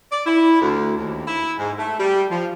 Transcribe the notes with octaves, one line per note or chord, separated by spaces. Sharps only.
D5
E4
D2
D#2
E4
G#2
A3
G3
F3